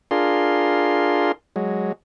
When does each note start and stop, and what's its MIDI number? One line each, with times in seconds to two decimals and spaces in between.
0.11 1.32 62
0.11 1.32 65
0.11 1.32 68
0.11 1.32 70
0.11 1.32 84
1.56 1.92 54
1.56 1.92 56